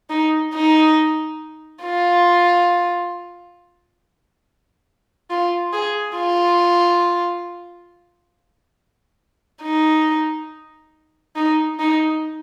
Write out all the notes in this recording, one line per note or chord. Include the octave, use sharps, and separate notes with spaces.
D#4
D#4
F4
F4
G#4
F4
D#4
D#4
D#4